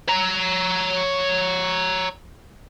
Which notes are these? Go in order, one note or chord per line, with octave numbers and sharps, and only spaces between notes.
C#5 A#5